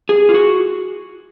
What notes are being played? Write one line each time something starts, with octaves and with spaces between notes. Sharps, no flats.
G#4
F4
F#4